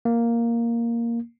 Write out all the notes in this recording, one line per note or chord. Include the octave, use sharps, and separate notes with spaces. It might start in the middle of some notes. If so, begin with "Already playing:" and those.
A#3